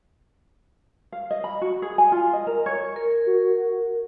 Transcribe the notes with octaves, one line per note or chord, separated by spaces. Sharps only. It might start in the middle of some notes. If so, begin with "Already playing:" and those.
F5
D#5
B5
F#4
G#4
G#5
F4
D#5
A#4
C#5
A#4
F#4